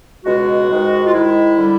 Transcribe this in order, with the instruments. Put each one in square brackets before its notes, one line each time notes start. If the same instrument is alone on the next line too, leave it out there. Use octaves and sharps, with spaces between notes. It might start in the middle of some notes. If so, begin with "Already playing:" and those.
[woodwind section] C#2 B2 G#3 F#4
G#2 D#3 G#3
F4
G#2 D#3 G#3 E4
D3 G3